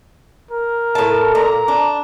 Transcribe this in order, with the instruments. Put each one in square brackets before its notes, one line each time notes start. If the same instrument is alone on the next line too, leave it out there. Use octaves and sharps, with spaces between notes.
[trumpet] A#4
[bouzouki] A2 A5
[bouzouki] A#2 [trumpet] A#5
[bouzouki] D4